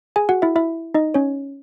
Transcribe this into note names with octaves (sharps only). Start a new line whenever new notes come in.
G#4 G#5
F#4 F#5
E4 E5
E4 E5
D#4 D#5
C#4 C#5